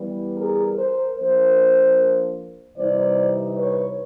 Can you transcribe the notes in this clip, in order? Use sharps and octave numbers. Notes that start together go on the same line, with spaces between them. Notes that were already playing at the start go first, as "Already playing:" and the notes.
Already playing: E3 G3 B3
G#4 A#4
A#4 C5
F3 A#3 D4 A#4 C5
C3 E3 G3 C4 D#4 C5 D5
B4 C#5